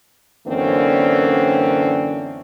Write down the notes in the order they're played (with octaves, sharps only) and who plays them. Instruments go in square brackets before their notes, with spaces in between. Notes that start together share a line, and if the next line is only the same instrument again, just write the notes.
[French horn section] F#2 D3 E3 A#3 C4 C#4